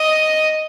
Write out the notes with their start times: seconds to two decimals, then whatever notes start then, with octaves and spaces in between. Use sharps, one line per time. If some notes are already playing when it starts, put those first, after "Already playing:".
Already playing: D#5